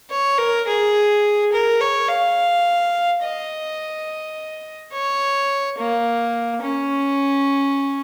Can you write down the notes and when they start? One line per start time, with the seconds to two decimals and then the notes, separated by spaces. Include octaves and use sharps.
0.10 C#5
0.38 A#4
0.67 G#4
1.52 A#4
1.81 C#5
2.08 F5
3.22 D#5
4.92 C#5
5.77 A#3
6.62 C#4